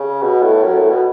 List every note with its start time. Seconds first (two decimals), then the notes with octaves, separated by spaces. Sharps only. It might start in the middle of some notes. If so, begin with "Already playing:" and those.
Already playing: C#3
0.22 B2
0.42 A2
0.63 F#2
0.77 A2
0.90 B2